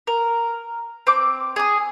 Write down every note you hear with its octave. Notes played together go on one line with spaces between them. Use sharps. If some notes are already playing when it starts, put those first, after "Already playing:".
A#4
C4 D6
G#4 D#6